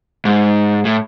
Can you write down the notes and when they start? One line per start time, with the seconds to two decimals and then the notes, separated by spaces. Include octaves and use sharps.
0.25 G#2
0.85 A2